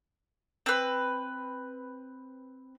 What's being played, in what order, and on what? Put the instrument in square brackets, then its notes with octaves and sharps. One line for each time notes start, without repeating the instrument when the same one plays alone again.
[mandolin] C4 B4